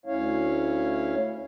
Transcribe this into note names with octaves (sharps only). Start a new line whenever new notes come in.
D2 C#4 E4 C#5 F5